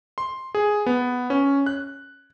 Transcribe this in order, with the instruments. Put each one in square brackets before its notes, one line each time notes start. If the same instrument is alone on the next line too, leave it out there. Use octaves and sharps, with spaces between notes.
[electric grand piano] C6
G#4
B3
C#4
F#6